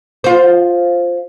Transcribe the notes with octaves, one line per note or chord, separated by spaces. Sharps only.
F4 C5